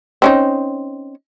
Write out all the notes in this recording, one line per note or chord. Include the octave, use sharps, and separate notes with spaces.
C4 C#4 D#4